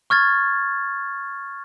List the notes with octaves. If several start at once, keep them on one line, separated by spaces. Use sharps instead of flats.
C#6 F6 G#6 A6